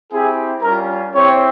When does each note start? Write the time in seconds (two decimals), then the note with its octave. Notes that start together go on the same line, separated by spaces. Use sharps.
0.11 C4 E4 G4 G#4
0.62 G3 C#4 F4 A#4
1.14 C4 E4 G4 C#5